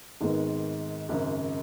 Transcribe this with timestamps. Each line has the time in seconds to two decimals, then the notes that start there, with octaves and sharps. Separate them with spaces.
0.21 G#1 G#2 D#3 G#3 B3
1.09 G#1 F#2 C#3